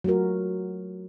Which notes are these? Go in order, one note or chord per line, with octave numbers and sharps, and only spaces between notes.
F#3 A3 F4 F#4 A#4